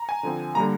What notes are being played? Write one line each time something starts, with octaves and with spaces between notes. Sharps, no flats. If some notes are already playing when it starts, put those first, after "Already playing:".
Already playing: A#5
G#5
D3 F3 C4
D3 G3 A#3 A#5